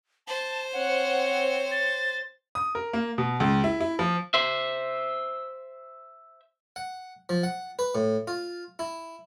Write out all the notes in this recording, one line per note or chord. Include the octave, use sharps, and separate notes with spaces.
C5 A5
C4 C#5 F#5
A6
D#6
A#4
A#3
B2
C#2
E4
E4
F3
C5 E5
F#5
F3
F#5
B4
A2
F4
E4